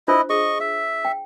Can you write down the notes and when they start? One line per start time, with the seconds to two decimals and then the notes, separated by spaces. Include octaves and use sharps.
0.08 D4 E4 F4 C5 D#5
0.30 G#4 D#5 C#6
0.60 E5
1.05 G5